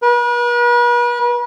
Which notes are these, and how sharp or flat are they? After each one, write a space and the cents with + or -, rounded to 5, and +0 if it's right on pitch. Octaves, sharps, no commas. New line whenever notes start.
B4 -40